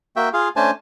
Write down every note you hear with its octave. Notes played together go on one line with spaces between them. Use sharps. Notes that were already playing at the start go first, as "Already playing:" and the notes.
A#3 F#4 E5 G5
F4 G#4 F5
A3 C#4 D4 C5 G#5 A5